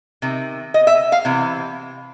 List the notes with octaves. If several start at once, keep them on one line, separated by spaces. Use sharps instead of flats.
C3 D#3
D#5
E5
F5
C3 E3